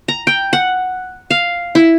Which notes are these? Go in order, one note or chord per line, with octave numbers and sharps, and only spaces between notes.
A#5
G5
F#5
F5
E4